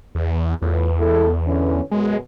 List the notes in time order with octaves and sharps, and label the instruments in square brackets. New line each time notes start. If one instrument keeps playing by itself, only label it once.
[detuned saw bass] E2
[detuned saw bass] E2 [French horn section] A2 F4 B4
[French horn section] G#3 E4 A4
D3 E3 C#4
[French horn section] F#2 B2 [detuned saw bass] G#3